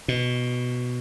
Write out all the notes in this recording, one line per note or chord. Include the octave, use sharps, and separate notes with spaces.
B2